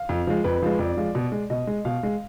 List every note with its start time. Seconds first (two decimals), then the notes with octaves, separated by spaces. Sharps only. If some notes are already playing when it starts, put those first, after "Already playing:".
Already playing: F5
0.09 F2
0.27 F3 G#3
0.44 F2 B4
0.62 F3 G#3
0.79 F2 D5
0.97 F3 G#3
1.15 B2
1.32 G#3
1.50 B2 D#5
1.67 G#3
1.85 B2 F5
2.03 G#3